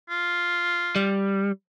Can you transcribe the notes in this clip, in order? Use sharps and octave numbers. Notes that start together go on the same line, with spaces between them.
F4
G3